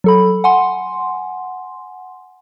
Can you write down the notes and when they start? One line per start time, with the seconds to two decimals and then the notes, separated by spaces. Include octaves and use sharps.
0.04 F#3 A4 B5
0.44 F#5 G#5 C6